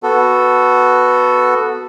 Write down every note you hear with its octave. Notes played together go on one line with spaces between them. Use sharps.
B3 F#4 A4